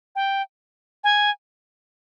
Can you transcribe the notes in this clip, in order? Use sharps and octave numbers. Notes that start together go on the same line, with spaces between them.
G5
G#5